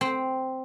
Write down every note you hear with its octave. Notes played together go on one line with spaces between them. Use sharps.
C4